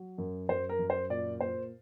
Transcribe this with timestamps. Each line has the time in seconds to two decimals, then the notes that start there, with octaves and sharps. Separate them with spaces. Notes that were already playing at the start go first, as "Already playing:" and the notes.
Already playing: F#3
0.18 F#2
0.49 F#2 C5
0.69 A#4
0.79 F#2
0.90 C5
1.10 A#2 D5
1.40 A#2 C5